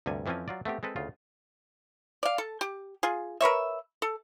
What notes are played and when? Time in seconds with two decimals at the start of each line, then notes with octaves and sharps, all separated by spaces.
0.06 D2 G2 C3 G3 G#5
0.26 F2 E3 F3 C4 C#4 G#5
0.48 F#3 F4 D5
0.65 A3 B3 C4 G4
0.83 G#3 C4 A4 B4
0.96 D2 C#3 F4
2.23 D5 F5
2.38 A4
2.61 G4
3.03 F4 G#4
3.41 A#4 B4 C#5 E5
4.02 A4